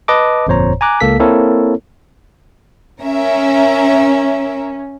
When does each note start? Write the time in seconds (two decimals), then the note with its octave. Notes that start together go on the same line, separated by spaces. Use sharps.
0.08 B4 D#5 A5 D6
0.47 G1 F2 A#2 C5 C#5 A#5
0.81 G#5 A#5 D6 F#6
1.01 C#2 A#3 A4 B6
1.19 A#3 C4 E4 A4 A#4 C#5
3.02 C#4 A#4 E5